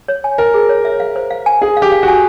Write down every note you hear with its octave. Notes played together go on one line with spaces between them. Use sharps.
C#5
G#5
A#4 G#5
G#4
C#5
E5
F5
C5
F5
G#5
G#4 F5
F5
G4
F5
F#4
G#5